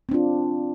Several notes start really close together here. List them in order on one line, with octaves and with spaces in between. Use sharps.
C4 D4 F4